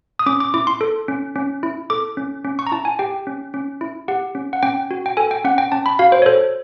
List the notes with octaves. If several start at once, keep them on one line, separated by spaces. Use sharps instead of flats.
D#6
C#4 D6
D6
E4 D6
C6
A4
C#4
C#4
E4
A4 D6
C#4
C#4
C#6
A#5
E4 A5
G#5
G4 G5
C#4
C#4
E4
G4 F#5
C#4
F#5
C#4 G5
F#4
G5
A4 G#5
G5
C#4 F#5
G5
C#4 A5
B5
F#4 F5
C5
C#5
A4 C5